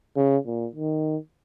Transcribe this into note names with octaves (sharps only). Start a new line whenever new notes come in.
C#3
A#2
D#3